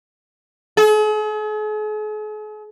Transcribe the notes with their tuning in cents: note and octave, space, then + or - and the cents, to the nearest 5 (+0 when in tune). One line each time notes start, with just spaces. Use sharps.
G#4 +45